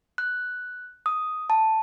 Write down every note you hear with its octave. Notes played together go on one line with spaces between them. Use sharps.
F#6
D#6
A5